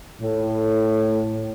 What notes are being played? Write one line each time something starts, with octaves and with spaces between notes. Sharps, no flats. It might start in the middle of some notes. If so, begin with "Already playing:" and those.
A2